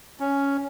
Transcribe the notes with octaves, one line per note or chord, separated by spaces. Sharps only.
C#4